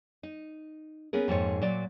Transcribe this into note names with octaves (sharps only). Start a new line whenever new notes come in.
D#4
B3 C#4 G#4 A#4
F2 G#2 A#3 D#4 C#5
A#2 F#3 D5